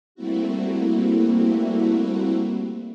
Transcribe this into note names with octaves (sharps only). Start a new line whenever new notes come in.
G3 A3 A#3 C4 E4 F#4